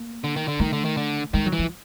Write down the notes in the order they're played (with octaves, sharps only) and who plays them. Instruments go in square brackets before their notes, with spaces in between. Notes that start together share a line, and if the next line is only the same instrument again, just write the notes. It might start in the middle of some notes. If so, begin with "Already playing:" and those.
Already playing: [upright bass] A#3
[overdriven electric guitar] D3
D#3
D3
[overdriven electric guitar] D#3 [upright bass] A3
[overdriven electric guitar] D3
D#3
D3
[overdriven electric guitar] D#3 [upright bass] G#3
[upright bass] F#3
[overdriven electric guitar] E3
[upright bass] F3